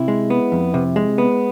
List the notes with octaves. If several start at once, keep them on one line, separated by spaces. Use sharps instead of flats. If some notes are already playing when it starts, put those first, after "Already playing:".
Already playing: C3 E4
G#3
B3
F2
C3
G#3
B3